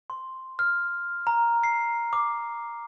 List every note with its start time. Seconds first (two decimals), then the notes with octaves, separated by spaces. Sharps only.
0.10 C6
0.59 F6
1.27 A#5
1.64 C7
2.13 D6